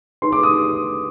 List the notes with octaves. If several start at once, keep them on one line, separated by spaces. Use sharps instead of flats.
D#4 G#4 B4 C6
D6
D#6